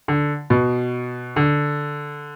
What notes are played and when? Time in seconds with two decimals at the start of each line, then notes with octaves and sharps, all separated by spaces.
0.08 D3
0.50 B2
1.36 D3